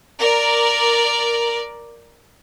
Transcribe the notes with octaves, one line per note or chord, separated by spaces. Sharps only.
A#4 D5